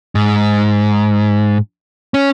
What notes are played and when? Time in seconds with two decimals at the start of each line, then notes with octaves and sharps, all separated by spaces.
0.15 G#2
2.14 C#4